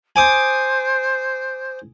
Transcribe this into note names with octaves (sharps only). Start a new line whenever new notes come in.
C5 G#5 D6 D#6